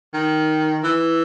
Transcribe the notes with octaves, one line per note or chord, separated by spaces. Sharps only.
D#3
E3